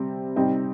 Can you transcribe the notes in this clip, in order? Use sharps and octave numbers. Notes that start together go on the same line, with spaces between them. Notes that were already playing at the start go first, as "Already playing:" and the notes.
Already playing: C3 G3 C4
C3 G3 C4 D#4